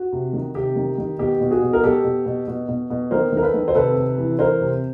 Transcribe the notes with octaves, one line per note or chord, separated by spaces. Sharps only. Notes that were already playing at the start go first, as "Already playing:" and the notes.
Already playing: F#4
C3
D#3
C3 G4
D#3
D#3
B2 G4
B2
F#4 G#4
B2
A#4
B2 G4 A4
B2
B2
B2
B2
B2
D#3 A#4 C5
D#3 A#4
A4 B4
D#3
C5
C3 A4 B4
C3
E3
E3 A#4 C5
C3